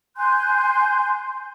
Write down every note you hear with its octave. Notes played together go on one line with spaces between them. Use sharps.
G#5 C6 F#6 G6